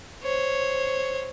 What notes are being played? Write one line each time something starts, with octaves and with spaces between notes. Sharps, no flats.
C5 C#5